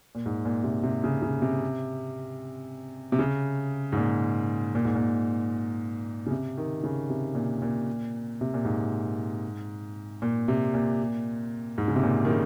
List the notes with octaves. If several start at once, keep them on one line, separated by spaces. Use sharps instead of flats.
A#2
G#2
A#2
C3
C3
C#3
C#3
C3
C3
C#3
G#2
A#2
A#2
G#2
A#2
C#3
C3
D#3
C#3
C3
A#2
A#2
C3
A#2
G#2
A#2
C3
A#2
G#2
C#3
C3
A#2
D#3
C#3